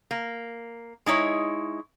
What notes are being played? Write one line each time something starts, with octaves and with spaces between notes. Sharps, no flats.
A#3
G#3 D#4 E4 C#5